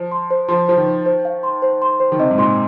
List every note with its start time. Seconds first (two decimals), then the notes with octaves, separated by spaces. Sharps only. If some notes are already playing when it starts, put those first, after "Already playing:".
Already playing: F3 C5
0.11 C6
0.30 C5
0.48 F3 C6
0.68 F3 C5
0.77 D#3
0.87 C5
1.06 C5
1.25 F5
1.43 C6
1.62 C5
1.82 C6
2.00 C5
2.12 D#3
2.19 C3 D#5
2.31 G#2
2.38 A#2 C6